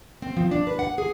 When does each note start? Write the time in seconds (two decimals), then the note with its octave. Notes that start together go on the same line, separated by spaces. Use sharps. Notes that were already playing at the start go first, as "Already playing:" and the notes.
0.22 C4
0.37 F3
0.51 D4
0.67 B4
0.79 F#5
0.98 G#4